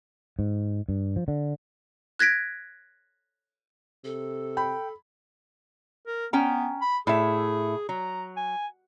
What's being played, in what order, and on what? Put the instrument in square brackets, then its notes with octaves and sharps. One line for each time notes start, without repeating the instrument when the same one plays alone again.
[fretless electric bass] G#2
G2
F3
D3
[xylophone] F#6 G#6 A#6 B6 D7
[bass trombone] C3 [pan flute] A4
[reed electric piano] G5 [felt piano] B5
[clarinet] A#4
[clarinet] B3 [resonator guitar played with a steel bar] C#4 G5 A#5
[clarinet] B5
[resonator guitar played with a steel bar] A2 E5 [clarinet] G#4
[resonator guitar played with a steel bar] F#3 [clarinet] A#5
[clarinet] G#5